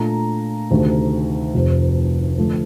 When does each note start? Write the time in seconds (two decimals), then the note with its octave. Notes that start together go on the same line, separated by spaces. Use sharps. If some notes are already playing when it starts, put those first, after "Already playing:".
Already playing: A#2 A3 D4 A#5
0.71 D2 C3 D#3 A3
1.54 F1 F2 C3
2.38 D3 F3 A3